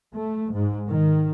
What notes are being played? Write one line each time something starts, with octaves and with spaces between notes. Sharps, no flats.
A3
G#2
D#3